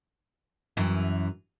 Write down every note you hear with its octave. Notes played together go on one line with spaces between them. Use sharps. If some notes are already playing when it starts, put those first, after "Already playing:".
F#2 E3